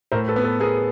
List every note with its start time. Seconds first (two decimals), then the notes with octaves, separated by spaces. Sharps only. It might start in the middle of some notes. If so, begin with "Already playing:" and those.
0.12 A2 A#4 C5
0.28 A4 B4
0.36 B3
0.44 A4 B4
0.60 B3 G#4 A#4